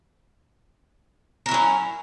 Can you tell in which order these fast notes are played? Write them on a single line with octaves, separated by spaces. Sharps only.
A#4 E4 F#3 C#4